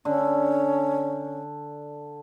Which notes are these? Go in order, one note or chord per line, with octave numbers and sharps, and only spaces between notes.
D3 C#4